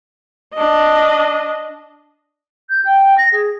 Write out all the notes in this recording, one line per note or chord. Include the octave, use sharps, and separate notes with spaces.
D4 D#5
G6
G5
A#6
G#4